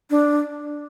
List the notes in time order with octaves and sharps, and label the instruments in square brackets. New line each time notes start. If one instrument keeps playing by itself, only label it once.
[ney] D4